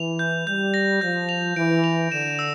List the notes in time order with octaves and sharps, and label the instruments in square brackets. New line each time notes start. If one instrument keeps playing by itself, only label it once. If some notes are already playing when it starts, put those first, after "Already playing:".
Already playing: [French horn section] E3 [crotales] F7
[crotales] G6
[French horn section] G3 [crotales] G6
[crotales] A#6
[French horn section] F3 [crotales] G6
[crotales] F7
[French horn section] E3 [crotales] D7
[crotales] F7
[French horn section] D3 [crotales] E7
[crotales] E6